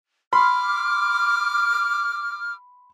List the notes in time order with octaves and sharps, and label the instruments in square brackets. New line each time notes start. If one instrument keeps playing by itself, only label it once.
[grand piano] B5 C6 [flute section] D6 F6